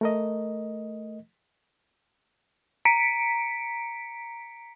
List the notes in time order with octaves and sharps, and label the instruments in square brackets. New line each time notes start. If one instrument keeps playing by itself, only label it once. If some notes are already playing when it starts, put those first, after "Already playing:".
[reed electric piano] A3 A#4 D#5
[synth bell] A#5 B6 C#7 D7